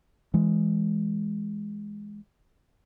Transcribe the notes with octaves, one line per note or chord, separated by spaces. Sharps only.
E3 G#3